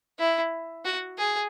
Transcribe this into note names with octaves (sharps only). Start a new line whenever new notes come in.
E4
F#4
G#4